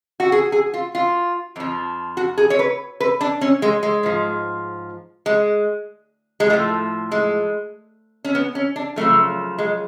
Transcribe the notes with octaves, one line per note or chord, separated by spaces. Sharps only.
F#4
G#4
G#4
F4
F4
F2 F3
F#4
G#4
C#5
B4
B4
D4
C#4
G#3
G#3
G#2 F3
G#3
G#3
A2 F3 A3
G#3
C#4
B3
C#4
D4
F#2 C#3 F3 A3
G#3